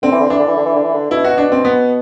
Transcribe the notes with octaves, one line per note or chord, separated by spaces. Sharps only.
D3 C4
E3
D3
E3 D4
D3
E3
D3
E3
D3
E3
D3
B2 E4
F#4
D4
C4
B3